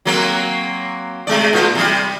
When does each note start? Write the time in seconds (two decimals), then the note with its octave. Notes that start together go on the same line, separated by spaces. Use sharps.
0.05 F#3 A#3 C4
1.27 C3 G#3 D5
1.53 A#2 F4
1.75 C3 G3